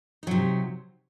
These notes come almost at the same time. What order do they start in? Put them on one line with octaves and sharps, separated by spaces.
D#4 F#3 C3